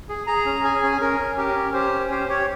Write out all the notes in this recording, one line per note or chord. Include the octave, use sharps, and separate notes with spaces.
G#4
G#4 A#5
C#4
G#4 G#5
C#4
C#4 A#4
C#4
G4 A#4
C#4
G4 C5
C#4
G4 C5
G4 C#5